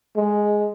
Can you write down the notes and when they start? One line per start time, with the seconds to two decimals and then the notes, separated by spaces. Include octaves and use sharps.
0.16 G#3